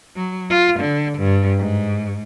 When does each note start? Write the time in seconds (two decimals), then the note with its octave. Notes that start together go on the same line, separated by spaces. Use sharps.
0.16 F#3
0.50 F4
0.80 D3
1.19 G2
1.59 G#2